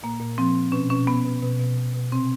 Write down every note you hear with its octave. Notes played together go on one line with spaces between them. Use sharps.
A#2 A#3
A#2
F3 C4
F3
B2 C#4
B2 C#4
B2 B3
B2
B2
B2
B2
B2
C3 C4